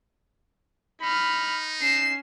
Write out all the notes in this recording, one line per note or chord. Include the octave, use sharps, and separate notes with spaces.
D#4 B5 F6
C#4 C7 E7